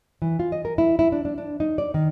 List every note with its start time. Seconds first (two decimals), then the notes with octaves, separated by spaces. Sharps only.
0.22 E3
0.39 F4
0.52 D#5
0.65 A#4
0.78 E4
0.99 E4
1.12 D4
1.25 D4
1.38 D4
1.60 D#4
1.78 D5
1.94 D#3